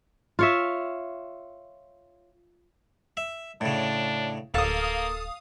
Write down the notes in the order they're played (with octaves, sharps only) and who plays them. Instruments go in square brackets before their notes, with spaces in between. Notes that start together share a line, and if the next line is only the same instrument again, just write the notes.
[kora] F4 C#5 E5
[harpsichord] E5
[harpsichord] A2 C#3 [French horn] D4
[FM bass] D1 [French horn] A#3 [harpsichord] A4 [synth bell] F5 D#6